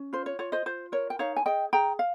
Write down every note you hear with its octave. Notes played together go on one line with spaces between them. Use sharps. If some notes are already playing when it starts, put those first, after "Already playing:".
Already playing: C#4
F4 C5
C#5
F4 C#5
C5 D#5
F4 C5
A#4 C#5
G5
D#4 C#5 F5
G#5
G#4 D#5 G5
G#4 G5 A#5
F5